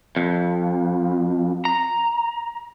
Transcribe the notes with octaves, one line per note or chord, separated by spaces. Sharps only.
F2
A#5